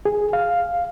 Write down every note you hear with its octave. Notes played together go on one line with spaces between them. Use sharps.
G#4
F5